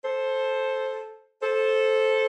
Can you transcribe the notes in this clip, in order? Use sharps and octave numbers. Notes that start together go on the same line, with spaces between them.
A4 C5
A4 C5